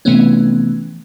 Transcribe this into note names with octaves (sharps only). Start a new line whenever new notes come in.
C3 E3 F3 A3 B3 C#4